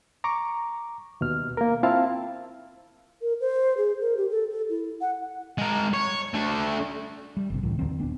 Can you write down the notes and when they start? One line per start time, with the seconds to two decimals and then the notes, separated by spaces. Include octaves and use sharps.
0.24 A#5 C#6 D6
1.21 D#2 B2 F6
1.57 A#3 A#4
1.83 C4 E4 F4 F5 A5
3.20 A#4
3.41 C5
3.77 G#4
4.01 A#4
4.17 G4
4.30 A4
4.50 A4
4.69 E4
5.01 F#5
5.58 G#3 A#4
5.93 C#5
6.34 A3 D4
7.37 G3
7.50 G1 C3
7.63 C#2 A2 D3 E3
7.79 D#2 D3 D#3 C4
7.99 D#1 B3 D4